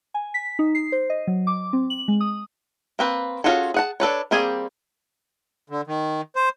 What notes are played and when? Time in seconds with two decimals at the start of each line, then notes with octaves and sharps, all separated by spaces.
0.14 G#5
0.34 B6
0.59 D#4
0.75 C7
0.92 C5
1.10 D#5
1.27 F#3
1.47 D6
1.73 C4
1.90 F#7
2.08 G#3
2.21 D#6
2.99 A#3 C4 B4
3.44 C#4 F4 F#4 G#4 A4
3.74 G#4 F#5 A5
4.00 D4 A4 B4 C#5
4.31 G3 A#3 C4 G#4 G#5
5.70 D3
5.87 D#3
6.36 C5